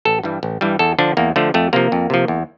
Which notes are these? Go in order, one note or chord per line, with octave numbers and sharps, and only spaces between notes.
A1 A4
G2 E3 G3
A1
G2 E3 G3
E2 A4
D3 F3 D4
E2 A#3
D3 F3 A3
F2 A3
C3 F3 A#3
F2
C3 F3
E2